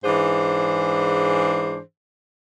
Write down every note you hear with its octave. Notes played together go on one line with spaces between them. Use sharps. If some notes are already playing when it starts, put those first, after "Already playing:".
G#2 E3 D4 G#4 C5